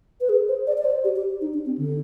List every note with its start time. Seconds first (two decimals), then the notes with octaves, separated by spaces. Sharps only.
0.21 B4
0.29 G#4
0.49 C5
0.67 D5
0.78 D5
0.85 C5
1.04 G4
1.16 G4
1.41 D#4
1.54 D4
1.66 C4
1.78 D3